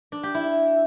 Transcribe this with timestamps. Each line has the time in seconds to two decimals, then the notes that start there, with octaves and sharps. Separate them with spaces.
0.12 D4
0.23 G4
0.35 E4